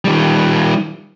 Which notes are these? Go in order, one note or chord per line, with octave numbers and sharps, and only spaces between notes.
D#3 G3